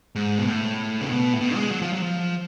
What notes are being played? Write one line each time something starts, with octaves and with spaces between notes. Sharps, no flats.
G#2
B2
A2
C#3
B2
A2
B2
G#3
F#3
F3
F#3
F3